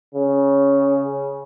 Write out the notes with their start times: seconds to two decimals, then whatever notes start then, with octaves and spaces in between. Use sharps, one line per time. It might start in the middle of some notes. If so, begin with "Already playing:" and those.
0.15 C#3